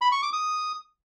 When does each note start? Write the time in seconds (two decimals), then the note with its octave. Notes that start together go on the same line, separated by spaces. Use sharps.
0.01 B5
0.12 C#6
0.22 D6
0.33 D#6